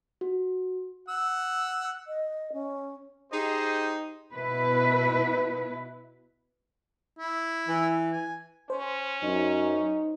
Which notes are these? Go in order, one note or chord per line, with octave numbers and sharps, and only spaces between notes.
F#4
F#5 E6
D#5
C#4
D#4 G4 G#4 C5 D#5
B2 E4 B4
E4
E3
G#5
C#4 C5
F#2 D#4